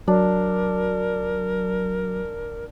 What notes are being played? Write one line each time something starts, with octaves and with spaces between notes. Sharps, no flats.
F#3 D4 A#4